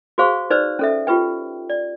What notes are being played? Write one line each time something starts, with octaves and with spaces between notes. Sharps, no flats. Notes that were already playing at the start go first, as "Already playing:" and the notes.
F#4 G#4 C5 F5 C#6
D#4 B4 C5 D5 E6
C#4 A4 E5
F4 G4 B4 G5
D5